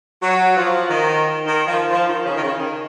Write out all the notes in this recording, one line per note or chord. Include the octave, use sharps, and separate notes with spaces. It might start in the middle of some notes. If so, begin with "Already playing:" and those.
F#3
F3
D#3
D#3
F3
F3
D#3
C#3
D#3
C#3
D#3